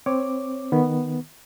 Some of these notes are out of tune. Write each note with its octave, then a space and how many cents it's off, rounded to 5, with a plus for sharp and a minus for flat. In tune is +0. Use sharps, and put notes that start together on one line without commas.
C4 +0 C#5 +0 D6 +0
D#3 +0 B3 +0